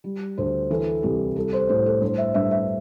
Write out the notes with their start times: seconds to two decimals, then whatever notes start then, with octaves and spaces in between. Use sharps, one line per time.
0.04 G3
0.38 D2 C5
0.70 E3 A4
1.03 C2 G4
1.36 G3 A4
1.53 C5
1.69 A2 C5
1.86 A4
2.01 G2 C5
2.18 E5
2.34 G2 E5
2.51 E5